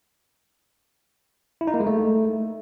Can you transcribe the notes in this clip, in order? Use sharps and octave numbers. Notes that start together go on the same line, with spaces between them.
E4
D#4
A#3
G#3
A3